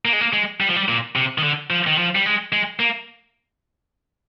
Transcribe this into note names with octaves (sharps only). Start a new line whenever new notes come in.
A#3
G#3
A#3
G#3
G3
F3
G3
A#2
C3
D#3
D3
F3
D#3
F3
G3
G#3
G#3
A#3